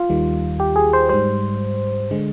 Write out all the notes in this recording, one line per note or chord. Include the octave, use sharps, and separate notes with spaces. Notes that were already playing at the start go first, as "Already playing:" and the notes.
Already playing: F4
D#2 D#3 G3
G4
G#4
C5
G#2 G3 C5
D3 G#3